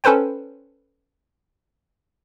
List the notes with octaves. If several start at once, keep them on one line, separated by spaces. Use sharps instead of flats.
C#4 A4 B4 C5 G5